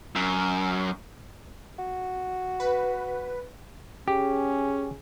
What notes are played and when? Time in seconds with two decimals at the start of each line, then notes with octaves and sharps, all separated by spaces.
0.16 F#2
1.79 F#4
2.60 B4
4.08 C#4 G4 G#4 G#5